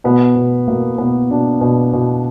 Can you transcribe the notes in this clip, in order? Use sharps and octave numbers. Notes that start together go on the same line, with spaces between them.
B2 B3
B2
B2 A#3
B2 B3
B2 D4
B2
B2